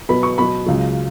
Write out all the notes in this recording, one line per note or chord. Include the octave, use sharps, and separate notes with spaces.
B2 F#3 B3 B5
C#6
B2 F#3 B3 B5
C#2 C#3 F#3